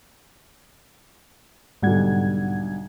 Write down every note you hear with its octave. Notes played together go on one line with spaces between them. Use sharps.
B1 G#2 D3 G3 F#5 G#6